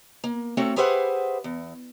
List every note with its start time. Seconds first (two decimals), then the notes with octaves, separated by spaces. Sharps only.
0.24 A#3
0.57 A3 C4 F#4 A4 C#5
0.76 G4 G#4 B4 C5 E5 F#5
1.44 E2